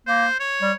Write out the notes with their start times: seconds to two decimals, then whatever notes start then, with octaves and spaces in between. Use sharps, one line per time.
0.07 A#3 C5
0.40 C#5
0.62 G3